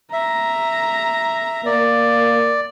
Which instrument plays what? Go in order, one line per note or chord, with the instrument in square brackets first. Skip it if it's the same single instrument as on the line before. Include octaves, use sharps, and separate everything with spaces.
[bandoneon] E5 [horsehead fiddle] A#5
[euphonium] A#3 [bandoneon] D5